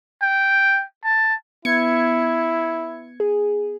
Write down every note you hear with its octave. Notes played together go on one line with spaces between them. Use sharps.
G5
A5
B3 E4 G#6 C#7
G#4